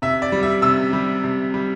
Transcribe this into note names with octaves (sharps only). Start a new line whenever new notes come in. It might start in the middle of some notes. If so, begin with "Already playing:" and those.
C3 E5
D5
G3
E5
C3 E6
G3
C3
G3